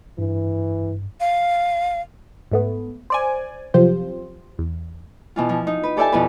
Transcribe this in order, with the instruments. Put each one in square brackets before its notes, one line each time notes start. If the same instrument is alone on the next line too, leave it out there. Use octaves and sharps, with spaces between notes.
[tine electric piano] G2 [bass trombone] E3
[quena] F5
[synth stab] G#2 A3 B3
C5 D5 G#5
F#2 C3 F3 F4 G4 C5
E2
[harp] B2 E3 F4
F3
D#4
B4
G4 A4 D5 E5 G#5 A5
F2 B2 E4 B4